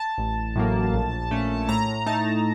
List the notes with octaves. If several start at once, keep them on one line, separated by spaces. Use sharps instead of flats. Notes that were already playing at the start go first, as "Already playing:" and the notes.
Already playing: A5
A1
A2 F#3 A#3
A#1
A#2 A3 C#4
A2 A#5
A3 D#4 A5